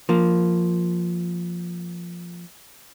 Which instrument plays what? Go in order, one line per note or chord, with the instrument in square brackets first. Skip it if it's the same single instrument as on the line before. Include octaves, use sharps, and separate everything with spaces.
[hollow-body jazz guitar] F3 A#3